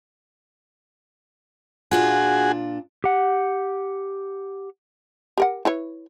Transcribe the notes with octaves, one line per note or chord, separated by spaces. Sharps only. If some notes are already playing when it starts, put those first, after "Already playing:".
A#2 D4 F4 F#4 G#4
G4 F#5
G4 A#4 F#5
E4 B4 C#5